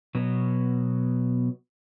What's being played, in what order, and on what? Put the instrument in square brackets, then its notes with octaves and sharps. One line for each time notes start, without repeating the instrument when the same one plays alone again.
[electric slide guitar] B2 F#3 B3